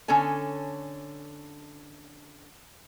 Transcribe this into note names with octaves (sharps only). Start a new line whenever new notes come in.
D3 C#4 A4 C#5 G#5